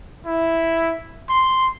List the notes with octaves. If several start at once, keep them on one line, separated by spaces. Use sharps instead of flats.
E4
C6